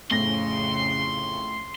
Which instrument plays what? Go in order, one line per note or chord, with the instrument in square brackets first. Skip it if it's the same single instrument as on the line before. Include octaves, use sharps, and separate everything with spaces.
[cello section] F2 C#3 [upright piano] A2 A#6 [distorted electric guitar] C6